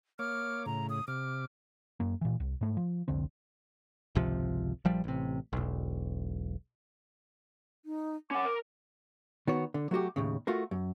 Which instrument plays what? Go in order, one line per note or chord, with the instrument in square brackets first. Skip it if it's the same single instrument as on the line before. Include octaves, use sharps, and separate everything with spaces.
[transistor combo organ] A#3 C#5 D6 [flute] F6
[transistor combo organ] A2 C#3 [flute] A#5
[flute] D#6
[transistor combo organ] C3 D6 [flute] F6
[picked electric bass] F#2 A#3
A#2 E3
C2
G#2 A3
F3
F1 C2 D3 C4
G#1 C#2 C3 F3
A#1 F3 G3
A1 C3
E1 B1
[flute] D#4
[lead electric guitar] C#4 F#5 [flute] D6
[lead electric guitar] A#4
[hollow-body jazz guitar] D#3 B3 F#4 C#5
D3
F#3 A3 F#4 G4
D#2 A2 C#3
A3 F4 F#4 A#4
F#2